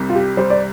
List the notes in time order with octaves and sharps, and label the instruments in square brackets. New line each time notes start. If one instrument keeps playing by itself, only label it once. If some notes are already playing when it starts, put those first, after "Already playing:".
Already playing: [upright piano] C2 C3 G3
[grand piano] F4
G4
[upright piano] G3 [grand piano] C5
[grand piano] D5